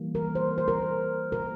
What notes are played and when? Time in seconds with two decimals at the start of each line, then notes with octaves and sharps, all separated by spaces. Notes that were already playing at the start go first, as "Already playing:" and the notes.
Already playing: E3 G3 A#3
0.15 A#4
0.35 C5
0.58 C5
0.68 A#4
1.32 A#4